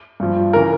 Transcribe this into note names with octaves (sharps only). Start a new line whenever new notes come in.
G2 F3
C#3 E3 A#4